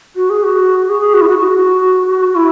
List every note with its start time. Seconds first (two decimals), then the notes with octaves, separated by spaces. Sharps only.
0.16 F#4
0.30 G#4
0.44 F#4
0.89 G#4
1.14 F#4
1.21 E4
1.28 F#4
1.38 F#4
2.35 E4